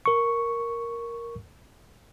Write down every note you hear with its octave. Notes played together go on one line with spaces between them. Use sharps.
A#4 C#6